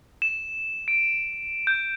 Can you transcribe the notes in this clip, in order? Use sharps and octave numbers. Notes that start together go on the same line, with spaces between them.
E7
D7
G6